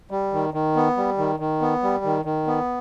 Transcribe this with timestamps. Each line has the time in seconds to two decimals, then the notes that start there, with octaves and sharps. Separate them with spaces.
0.11 G3
0.33 D#3
0.54 D#3
0.76 B3
0.97 G3
1.18 D#3
1.40 D#3
1.61 B3
1.83 G3
2.04 D#3
2.25 D#3
2.47 B3